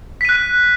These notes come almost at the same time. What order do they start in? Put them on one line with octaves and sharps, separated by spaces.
B6 D#7 F#6